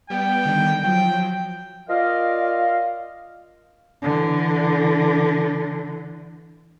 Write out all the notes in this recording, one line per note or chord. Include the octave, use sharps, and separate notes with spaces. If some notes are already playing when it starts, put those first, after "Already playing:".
G3 B3 G5
D3 D#3 G3
F3 F#3 G5
F4 A#4 D5 D#5 F5
D3 E3